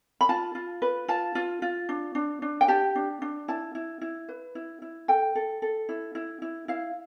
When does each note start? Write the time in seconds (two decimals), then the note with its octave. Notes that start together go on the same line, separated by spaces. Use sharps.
0.21 B5
0.29 F4 A5
0.55 F4
0.82 B4
1.08 F4 A5
1.35 F4
1.62 F4
1.89 D4
2.15 D4
2.42 D4
2.61 G5
2.68 G4 A5
2.95 D4
3.22 D4
3.48 E4 A5
3.75 E4
4.01 E4
4.29 B4
4.55 E4
4.82 E4
5.08 A4 G5
5.35 A4
5.62 A4
5.89 E4
6.15 E4
6.42 E4
6.68 E4 F5